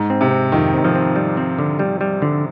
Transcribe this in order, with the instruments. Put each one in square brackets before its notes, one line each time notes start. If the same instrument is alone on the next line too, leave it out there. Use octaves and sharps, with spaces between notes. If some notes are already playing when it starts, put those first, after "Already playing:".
Already playing: [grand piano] G#2
[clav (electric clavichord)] C4
[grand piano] C3
[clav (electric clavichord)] C4
[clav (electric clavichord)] F2 [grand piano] D#3
[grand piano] D#3 [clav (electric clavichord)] C4
[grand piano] F3
[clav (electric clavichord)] C4
G3
C4
D3
G3
G3
D3